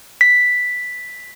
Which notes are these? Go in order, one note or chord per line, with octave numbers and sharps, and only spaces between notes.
B6